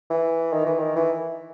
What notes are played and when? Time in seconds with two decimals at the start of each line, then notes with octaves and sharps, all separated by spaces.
0.10 E3
0.53 D#3
0.66 E3
0.79 D#3
0.96 E3